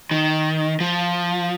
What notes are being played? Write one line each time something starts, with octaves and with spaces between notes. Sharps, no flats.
D#3
F3